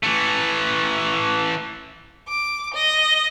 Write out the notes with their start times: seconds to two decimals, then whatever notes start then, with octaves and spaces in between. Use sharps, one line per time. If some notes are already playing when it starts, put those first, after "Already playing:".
0.03 E3 A3
2.28 D6
2.74 D#5